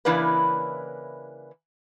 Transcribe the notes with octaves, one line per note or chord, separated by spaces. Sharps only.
C#3 E3 A#3 D4 E4 B4